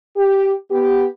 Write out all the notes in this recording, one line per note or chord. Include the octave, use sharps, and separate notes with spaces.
G4
B3 G4